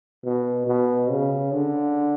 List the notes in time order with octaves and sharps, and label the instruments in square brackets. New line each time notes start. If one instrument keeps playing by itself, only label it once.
[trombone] B2
B2
C#3
D3